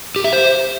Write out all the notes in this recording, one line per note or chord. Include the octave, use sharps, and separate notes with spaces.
G4
E5
C5